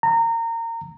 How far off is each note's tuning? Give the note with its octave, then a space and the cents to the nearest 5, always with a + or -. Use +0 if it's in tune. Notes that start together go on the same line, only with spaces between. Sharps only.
A#5 -25